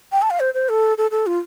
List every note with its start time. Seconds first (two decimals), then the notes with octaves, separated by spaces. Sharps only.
0.12 G5
0.22 A5
0.30 F5
0.40 C5
0.54 C5
0.69 A4
0.98 A4
1.11 A4
1.26 F4